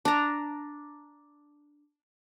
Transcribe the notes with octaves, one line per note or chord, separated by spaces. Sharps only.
D4 A#5